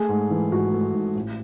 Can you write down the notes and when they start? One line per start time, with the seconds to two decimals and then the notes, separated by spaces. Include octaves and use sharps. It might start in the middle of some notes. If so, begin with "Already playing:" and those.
Already playing: A3 G#4
0.09 G#2
0.31 E3
0.52 G#1 F#4
0.73 A3
0.94 G#2
1.15 A1